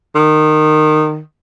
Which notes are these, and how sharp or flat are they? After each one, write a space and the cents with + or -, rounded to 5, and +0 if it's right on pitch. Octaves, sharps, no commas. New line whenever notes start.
D#3 -20